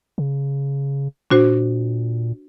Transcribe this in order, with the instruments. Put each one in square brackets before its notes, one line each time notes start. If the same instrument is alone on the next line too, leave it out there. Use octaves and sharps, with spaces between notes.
[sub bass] C#3
[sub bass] A#2 [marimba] D4 F#4 C5